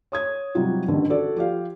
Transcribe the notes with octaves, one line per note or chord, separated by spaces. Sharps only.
C#5 D#6 G#6
C3 F#3 G3 D#4 F4 F#4
A1 G2 D3 D#3
F#4 A4 D5
F3 G4 F5